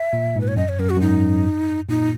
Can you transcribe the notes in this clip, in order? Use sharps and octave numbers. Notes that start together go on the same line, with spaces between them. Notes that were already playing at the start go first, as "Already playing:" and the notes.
Already playing: E5
A#2
G#2
B4
C#5
F#2 D#5
C#5
F#2 A#4
F#4
F#2
G#2 D#4
A#2 D#4